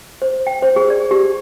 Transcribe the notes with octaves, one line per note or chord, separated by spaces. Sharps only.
C5
G5
C5
G#4
D5
G4